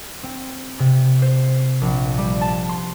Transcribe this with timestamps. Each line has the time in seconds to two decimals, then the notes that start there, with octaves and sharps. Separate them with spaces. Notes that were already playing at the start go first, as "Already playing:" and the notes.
0.23 C4
0.79 C3
1.22 C5
1.81 A#1
2.18 G3
2.41 A5
2.69 C6